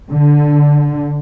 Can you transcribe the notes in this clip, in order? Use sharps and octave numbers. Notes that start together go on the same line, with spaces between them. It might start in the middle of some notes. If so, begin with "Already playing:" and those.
D3